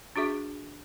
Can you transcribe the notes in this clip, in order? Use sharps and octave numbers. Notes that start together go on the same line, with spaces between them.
D4 F#4 G#4 E5